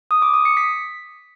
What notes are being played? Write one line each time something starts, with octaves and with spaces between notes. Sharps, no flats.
D#6
D6
D#6
C#7
B6